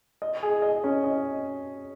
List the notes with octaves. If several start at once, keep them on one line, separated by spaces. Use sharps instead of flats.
D#5
G#4
D#5
C#4
D#5